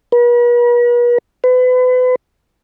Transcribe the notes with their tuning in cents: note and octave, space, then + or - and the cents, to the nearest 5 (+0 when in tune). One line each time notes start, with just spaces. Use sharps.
B4 -45
B4 +35